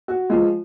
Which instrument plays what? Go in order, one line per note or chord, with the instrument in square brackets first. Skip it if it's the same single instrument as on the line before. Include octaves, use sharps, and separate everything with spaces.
[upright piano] F#4
F3 G#3 F4